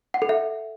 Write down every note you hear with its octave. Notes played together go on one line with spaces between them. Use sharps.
F#5
A4
E5